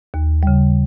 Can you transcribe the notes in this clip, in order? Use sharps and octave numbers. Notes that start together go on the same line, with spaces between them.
D#2
C#3 G3